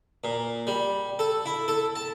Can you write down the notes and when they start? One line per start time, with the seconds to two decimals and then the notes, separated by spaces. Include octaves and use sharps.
0.24 A#2
0.67 G3
1.19 A4
1.46 E4
1.68 A4
1.96 A5